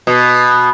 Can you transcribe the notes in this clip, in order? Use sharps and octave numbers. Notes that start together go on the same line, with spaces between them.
B2